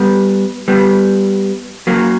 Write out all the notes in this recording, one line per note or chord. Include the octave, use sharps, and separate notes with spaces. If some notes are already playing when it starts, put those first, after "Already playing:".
Already playing: G3 B3
G3 B3
F#3 A#3